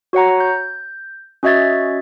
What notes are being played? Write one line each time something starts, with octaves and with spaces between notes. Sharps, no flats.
F#4 C#5 F#5 A#5
G6
C#4 F#4 D#5 E5 G#6 A6